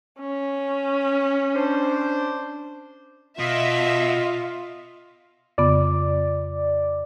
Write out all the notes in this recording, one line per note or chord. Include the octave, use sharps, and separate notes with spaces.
C#4
D4 C5
B2 F4 D#5 E5
F2 C#3 B3 D5